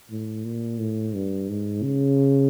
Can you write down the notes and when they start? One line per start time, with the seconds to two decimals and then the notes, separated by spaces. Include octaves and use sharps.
0.10 A2
0.45 A#2
0.80 A2
1.15 G2
1.49 G#2
1.83 C#3